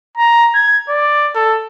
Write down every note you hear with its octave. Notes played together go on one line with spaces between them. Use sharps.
A#5
G#6
D5
A4